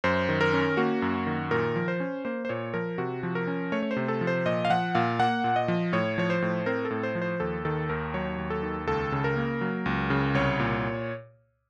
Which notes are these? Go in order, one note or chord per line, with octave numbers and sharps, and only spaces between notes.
F#2 C5
D#3
A#4
C#4
A#3 F#4
F#2
D#3
A#2 A#4
F3
C5
C#4
A#3 C5
C5
A#2 C#5
F3 A#4
C3 F#4
F3
A#4
C#4
A3 C#5
C#5
C5
C3
A4
F3
C5
A#2 D#5
F5
F3 F#5
A#2 F5
A#3 F#5
A#2
D#5
F3
A2 C#5
F3 C#5
C5
A2
C4 A#4
A4
A2
C5
F3
C5
D#2 A4
D#3 A4
D#2 A#4
F#3 C#5
D#2
A4
D#3
C#2 A4
C#3
A#4
A#3
F#3
C#2
C#3
C2 C#5
A#2